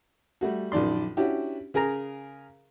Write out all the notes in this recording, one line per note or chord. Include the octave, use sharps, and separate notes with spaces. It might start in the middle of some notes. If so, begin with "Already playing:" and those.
G3 A3 F#4
A#1 F#2 D#3 D5 C6
C#4 D4 E4 F#4 G4
C#3 G#4 A#4 G#5 A#5